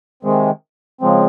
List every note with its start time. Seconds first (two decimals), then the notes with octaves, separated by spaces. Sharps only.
0.23 C3 D#3 G#3
1.01 C#3 F3 G#3 C4